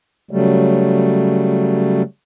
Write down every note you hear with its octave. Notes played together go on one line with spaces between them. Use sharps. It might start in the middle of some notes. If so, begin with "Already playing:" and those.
C#3 F#3 G3 A3